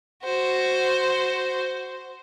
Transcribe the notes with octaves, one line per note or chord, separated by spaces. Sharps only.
F#4 C5